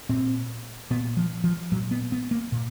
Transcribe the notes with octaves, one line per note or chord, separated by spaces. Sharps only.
A#2 C4
A#2 B3
F3
F3
A#2 F#3
B3
B3
A#3
A#2